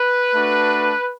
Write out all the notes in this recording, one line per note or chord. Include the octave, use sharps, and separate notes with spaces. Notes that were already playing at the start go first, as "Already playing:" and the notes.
Already playing: B4
A3 D4 F#4